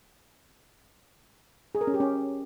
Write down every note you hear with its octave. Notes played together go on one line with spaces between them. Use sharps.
G#4
A#4
C#4
G4
C#4